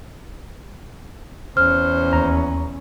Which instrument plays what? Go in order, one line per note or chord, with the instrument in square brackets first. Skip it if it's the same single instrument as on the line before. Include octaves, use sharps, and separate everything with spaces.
[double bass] E2 C#4 [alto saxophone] C5 [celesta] F6
[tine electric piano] D#2 A#5